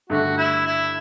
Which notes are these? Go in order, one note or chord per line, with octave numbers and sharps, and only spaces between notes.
G2 D3 A3 F#4
E4
E4